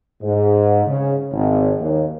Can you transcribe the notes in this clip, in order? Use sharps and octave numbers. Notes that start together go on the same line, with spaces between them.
G#2
C#3
G#1
D#2